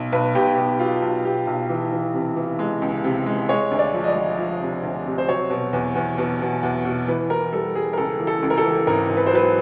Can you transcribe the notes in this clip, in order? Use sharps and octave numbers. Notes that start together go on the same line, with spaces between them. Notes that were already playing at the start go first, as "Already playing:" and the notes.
Already playing: B1
B1 B4
B1 G4
B1
F#3 F4
B1
B1 G4
B1
E3
E3
C3
E3
G#3
C#2
C3
G#3
G#3 C#5
D2
D5
F3
D#5
D5
F3
F3
C3
D2
C3
C5
F#3 C#5
B2
E2
E2
B2
B2
E2
B2
E3 B4
E3 A#4
G3 A4
G3 G#4
A#4
C#2 A4
E3
A4
C#2
A#4
A4
E3
G#1 A#4
G#1
B4
C5
F#3 B4